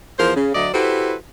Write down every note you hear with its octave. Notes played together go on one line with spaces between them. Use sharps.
E2 F3 A#4 C5
C#3
D2 F#3 A3 D5 D#5
E4 F#4 G4 A4 B4 C5